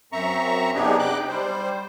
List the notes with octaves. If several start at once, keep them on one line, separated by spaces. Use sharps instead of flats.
F#2 C4 E5 A#5 C#6
C3 B3 D4 D#4 G4 G#4
G5 D6 F#6
G3 C5